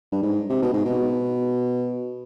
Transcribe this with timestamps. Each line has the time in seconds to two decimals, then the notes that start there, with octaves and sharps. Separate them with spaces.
0.12 G2
0.22 G#2
0.50 C3
0.62 B2
0.73 G#2
0.85 B2